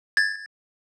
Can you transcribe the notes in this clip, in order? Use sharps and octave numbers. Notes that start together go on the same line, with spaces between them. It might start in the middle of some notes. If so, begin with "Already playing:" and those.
G#6 A6